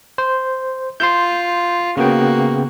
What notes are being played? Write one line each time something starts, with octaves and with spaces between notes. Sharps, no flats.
C5
F4 C6 G6
C#3 A#3 B3 F#4 G5